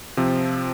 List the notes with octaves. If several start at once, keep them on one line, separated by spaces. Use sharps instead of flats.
C3 F3 C4